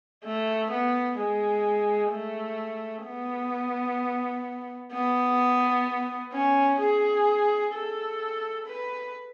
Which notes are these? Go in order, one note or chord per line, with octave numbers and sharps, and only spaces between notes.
A3
B3
G#3
A3
B3
B3
C#4
G#4
A4
B4